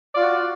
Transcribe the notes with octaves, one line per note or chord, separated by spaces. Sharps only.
F4 F#4 D5